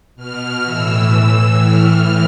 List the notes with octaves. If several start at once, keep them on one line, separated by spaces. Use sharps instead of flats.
B2 F6
A2 E3 E6
A2 E3
A2 E3 F6